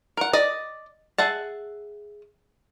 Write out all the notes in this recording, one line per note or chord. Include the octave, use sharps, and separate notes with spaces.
A#4 F#5
D5 D#5
G#4 E5 F#5 A5